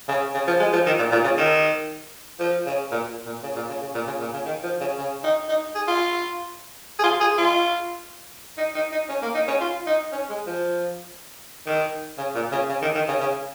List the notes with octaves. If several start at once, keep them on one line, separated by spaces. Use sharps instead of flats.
C#3
C#3
F3
G#3
F3
D#3
A#2
A#2
C#3
D#3
F3
C#3
A#2
A#2
C#3
A#2
C#3
C#3
A#2
C#3
A#2
C#3
D#3
F3
C#3
C#3
D#4
D#4
G#4
F4
G#4
F4
G#4
F4
D#4
D#4
D#4
C#4
A#3
D#4
C#4
F4
D#4
C#4
G#3
F3
D#3
C#3
A#2
C#3
C#3
D#3
D#3
C#3
C#3